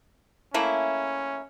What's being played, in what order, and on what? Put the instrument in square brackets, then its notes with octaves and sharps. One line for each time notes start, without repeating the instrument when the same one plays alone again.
[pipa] A3 A#3 E4 [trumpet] C#4